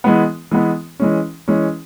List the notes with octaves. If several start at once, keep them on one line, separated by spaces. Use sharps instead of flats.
E3 G#3 B3
E3 G#3 B3
E3 G#3 C#4
E3 G#3 C#4